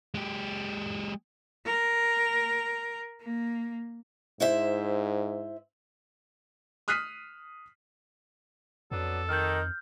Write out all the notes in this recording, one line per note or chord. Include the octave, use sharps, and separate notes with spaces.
G#3 G4
A#4
A#3
G#2 E4 C5 E5
D#6 F6 F#6 B6 C7 D#7
F2 F#3 B3 D4 A4
D#3 F6 G6